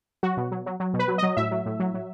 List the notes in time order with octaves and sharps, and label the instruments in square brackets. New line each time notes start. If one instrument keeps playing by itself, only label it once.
[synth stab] F#3 F#4
B2
F#3
F#3
F#3
B2
B4
F#3
F#3 D#5
A2 E5
F#3
A2
F#3
F#3